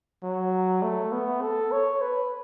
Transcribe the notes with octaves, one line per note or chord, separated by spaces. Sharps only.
F#3
A3
B3
A4
C#5
B4